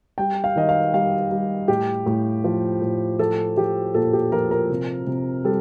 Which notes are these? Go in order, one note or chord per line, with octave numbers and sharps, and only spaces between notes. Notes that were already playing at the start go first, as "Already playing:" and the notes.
G3 G5
F5
D#3 D#5
F5
G3 F5
G3
A2 G4
A2
F3
A2
F3 A4
F3 G4
A#2 A4
G4
F3 A#4
A#4
C3
C3
G3 A4